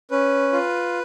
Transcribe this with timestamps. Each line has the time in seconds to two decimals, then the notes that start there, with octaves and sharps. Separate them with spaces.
0.11 C#4 B4
0.52 F4